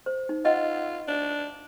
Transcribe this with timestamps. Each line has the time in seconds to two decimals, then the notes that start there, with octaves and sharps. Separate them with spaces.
0.06 C5
0.29 D#4
0.45 F4 D#5 F#5
1.08 D4